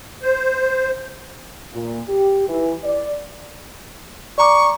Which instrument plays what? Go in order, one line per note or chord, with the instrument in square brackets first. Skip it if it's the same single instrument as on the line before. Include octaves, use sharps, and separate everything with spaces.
[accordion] C5
[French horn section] A#2
G4
E3
D5
[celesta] D5 A#5 D6 [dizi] C#6